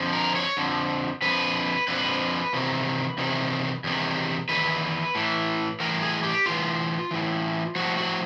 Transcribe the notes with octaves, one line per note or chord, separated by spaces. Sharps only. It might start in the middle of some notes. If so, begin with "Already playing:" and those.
Already playing: F2 D3 F3
A#4
C#5
F2 D3 F3
F2 D3 F3 B4
F2 D3 F3 B4
E2 C3 D#3
E2 C3 D#3
E2 C3 D#3
E2 C3 D#3 B4
A2 E3
A2 E3 A#4
G#4
G4
A2 E3 F4
A2 E3
A2 F3 F#4
F#4